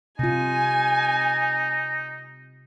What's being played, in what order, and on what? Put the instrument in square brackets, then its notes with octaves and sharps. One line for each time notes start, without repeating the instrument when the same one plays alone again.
[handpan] C3 F4 [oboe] D#4 [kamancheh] G#5